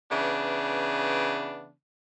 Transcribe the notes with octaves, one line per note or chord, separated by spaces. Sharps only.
C#3 E3 B3 D4